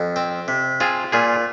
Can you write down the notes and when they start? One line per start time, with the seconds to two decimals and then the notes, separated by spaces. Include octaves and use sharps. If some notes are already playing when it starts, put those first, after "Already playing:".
Already playing: F2
0.16 C4
0.48 C3
0.80 C4 F4 G#4
1.12 A#2 F4 G#4